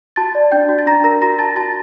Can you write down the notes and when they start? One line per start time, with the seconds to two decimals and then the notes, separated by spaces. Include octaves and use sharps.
0.16 F#4 A5 A6
0.35 D5
0.51 D4 G5 G6
0.69 F#4
0.78 A6
0.87 D4 A#5 A#6
1.04 A#4 A#5 A#6
1.22 F#4 A#5 A#6
1.39 F#4 A5 A6
1.56 F#4 A5 A6